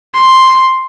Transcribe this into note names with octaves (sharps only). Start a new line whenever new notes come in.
C6